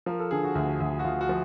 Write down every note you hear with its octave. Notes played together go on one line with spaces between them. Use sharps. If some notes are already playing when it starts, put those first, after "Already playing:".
F3 A#4
A4
D3 G#4
F#4
D2
D2
F#4
D2 F4
F#4
F3